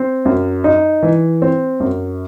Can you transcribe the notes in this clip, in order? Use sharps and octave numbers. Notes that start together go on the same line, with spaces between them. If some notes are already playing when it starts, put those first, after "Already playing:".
Already playing: C4
F#2
D#4
E3
C4
F#2